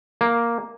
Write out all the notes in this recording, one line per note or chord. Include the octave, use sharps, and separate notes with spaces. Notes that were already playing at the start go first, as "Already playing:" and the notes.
A#3